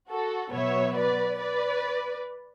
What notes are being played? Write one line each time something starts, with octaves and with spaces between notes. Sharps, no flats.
F#4 A4
B2 F#3 B3 C#5 E5
B4 D5
B4 D5